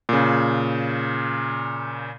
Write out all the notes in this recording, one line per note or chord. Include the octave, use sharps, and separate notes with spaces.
A#2 C#3